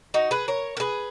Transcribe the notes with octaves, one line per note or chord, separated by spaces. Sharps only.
D#4 F#4
G#4 B4
A#4 C#5
A#4
G#4 B4